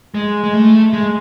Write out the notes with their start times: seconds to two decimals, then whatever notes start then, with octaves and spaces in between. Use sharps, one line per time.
0.14 G#3
0.44 G#3
0.54 A3
0.93 G#3